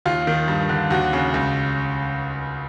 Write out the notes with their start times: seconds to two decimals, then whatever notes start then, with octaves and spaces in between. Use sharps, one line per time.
0.06 D#2 F4
0.27 D#3
0.48 G2
0.69 D3
0.90 D#2 F#4
1.13 C#3
1.34 C#2